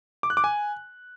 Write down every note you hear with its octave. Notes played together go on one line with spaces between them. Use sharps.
D6
F#6
D6
G#5